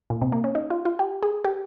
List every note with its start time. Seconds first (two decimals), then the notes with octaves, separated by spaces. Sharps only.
0.10 A#2
0.21 C3
0.32 A#3
0.44 C#4
0.55 D#4
0.70 F4
0.85 F4
0.99 G4
1.23 G#4
1.45 G4